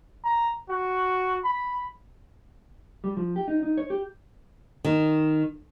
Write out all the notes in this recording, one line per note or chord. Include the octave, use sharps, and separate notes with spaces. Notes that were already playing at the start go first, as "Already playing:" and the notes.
A#5
F#4
B5
G3
F3
G4
D#4
D#4
C#5
G4
D#3